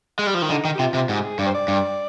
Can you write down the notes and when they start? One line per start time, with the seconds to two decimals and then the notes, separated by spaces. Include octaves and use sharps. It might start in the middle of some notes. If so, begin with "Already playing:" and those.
0.19 G#3
0.27 G3
0.34 F3
0.42 D#3
0.50 D3 D#4
0.65 D#3
0.74 G4
0.79 C3 F4
0.94 C3
1.09 G#2 G4
1.24 G#4
1.39 G2 D5
1.46 C5
1.54 D5
1.68 G2